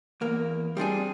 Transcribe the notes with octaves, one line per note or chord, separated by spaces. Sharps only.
E2 A#3
G3 C4 D4 G#4